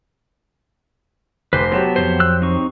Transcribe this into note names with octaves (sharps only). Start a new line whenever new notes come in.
F1 G4 B4 C5
F#3 B3 G4 A5
F2 A#2 C5
E6 F#6
C4 D#4 C#6